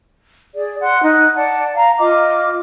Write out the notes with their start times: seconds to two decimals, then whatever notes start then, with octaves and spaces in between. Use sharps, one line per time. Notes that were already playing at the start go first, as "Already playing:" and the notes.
0.54 G#4 D5
0.81 F#5 C6
1.01 D#4 F#6
1.35 D5 F#5 A5
1.74 F5 A#5
1.99 F4 D#5 D6